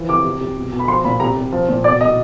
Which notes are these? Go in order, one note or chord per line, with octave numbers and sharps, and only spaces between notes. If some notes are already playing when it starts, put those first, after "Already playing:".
Already playing: E3 F3
C3 D6
C3
C3
B2
B2
B5
F3 C6
A#2 B5
C3 A#5
C3
F3
A#2
B2 D5
B2 D#5